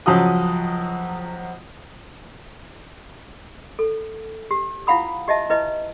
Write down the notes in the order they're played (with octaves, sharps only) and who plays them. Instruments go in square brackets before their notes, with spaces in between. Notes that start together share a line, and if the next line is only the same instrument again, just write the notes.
[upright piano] C#2 F3 F#3 F#4 D#6
[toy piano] A4
G4
E4 F4 F5 F#5 B5 D#6
G4 D#5 E5 A5
E4 B4 D#5